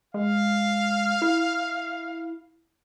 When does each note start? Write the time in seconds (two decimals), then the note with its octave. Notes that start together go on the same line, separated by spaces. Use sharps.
0.14 G#3 F5
1.22 E4